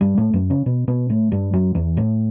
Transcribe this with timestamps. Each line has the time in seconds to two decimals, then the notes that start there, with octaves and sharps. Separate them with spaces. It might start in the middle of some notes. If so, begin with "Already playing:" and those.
0.01 G2 G3
0.17 A2 A3
0.34 F#2 F#3
0.50 C#3 C#4
0.66 B2 B3
0.88 B2 B3
1.10 A2 A3
1.32 G2 G3
1.53 F#2 F#3
1.75 E2 E3
1.97 A2 A3